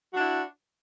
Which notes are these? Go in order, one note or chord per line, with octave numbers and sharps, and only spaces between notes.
D4 E4 F#4